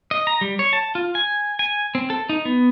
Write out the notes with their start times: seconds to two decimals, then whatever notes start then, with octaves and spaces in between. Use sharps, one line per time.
0.11 D#5
0.27 A#5
0.41 G3
0.59 C#5
0.73 A5
0.95 F4
1.15 G#5
1.59 G#5
1.95 C4
2.10 A4
2.29 D#4
2.45 B3